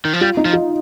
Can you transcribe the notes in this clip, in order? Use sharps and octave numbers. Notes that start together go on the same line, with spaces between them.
D#3
F3
G3 F4
D#4
F3
F4